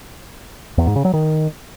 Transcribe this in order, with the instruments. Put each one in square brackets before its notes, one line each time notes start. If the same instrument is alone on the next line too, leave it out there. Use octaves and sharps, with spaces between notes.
[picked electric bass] E2
G#2
C#3
F#3
D#3